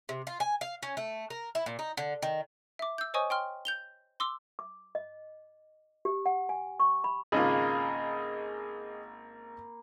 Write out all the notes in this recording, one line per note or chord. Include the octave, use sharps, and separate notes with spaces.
C3
F4
G#5
F5
C#4
A3
A#4
E4
A#2
D#4
D3
D#3
E5 D6
E6 G6
C5 C#5 D#5 G#5 C#6 D#6
G5 C6 F6
G6 F7 G7
C6 D6 E6
D6
D#5
G4
F#5
G#5
C#6
B5
G#1 C#3 A#3 F4 G#4 D#5 B5